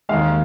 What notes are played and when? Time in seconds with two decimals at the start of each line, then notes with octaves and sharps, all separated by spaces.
0.09 D#2 D#3 G#3 F5